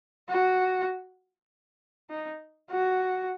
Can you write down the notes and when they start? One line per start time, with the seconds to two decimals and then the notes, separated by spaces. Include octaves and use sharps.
0.29 F#4
2.10 D#4
2.71 F#4